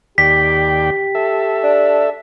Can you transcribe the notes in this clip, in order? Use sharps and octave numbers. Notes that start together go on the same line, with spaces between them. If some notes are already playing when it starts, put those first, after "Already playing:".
D#2 G4 D5 G5 B6
A4 E5
D4